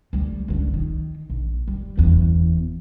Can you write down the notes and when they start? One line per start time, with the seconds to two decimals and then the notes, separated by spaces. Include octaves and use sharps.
0.13 D2 G3
0.48 C#2 D3
0.74 D#3
1.30 A#1
1.68 G3
1.97 F#1 E2